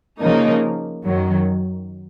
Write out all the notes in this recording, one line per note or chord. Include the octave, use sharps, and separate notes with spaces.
C#3 F3 A#3 D#4 A#4
F#2 D#3 F#3